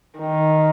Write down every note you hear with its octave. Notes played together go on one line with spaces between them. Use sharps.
D#3